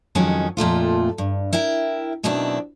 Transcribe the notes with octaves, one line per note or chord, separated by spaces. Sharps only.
F2 D#3 F#3 G#3 C#4
F2 A#2 A3 F4
G2
E4 A#4 E5 G5
F#2 B2 D#3 C4 D4 E4